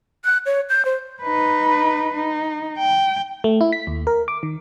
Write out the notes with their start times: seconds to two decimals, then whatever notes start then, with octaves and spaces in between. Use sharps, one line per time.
0.25 F#6
0.46 C#5
0.69 G6
0.85 C5
1.23 D#4 B4
2.14 D#4
2.79 G5
3.44 A3
3.61 E4
3.72 B6
3.87 D#2
4.07 A#4
4.28 D6
4.43 D#3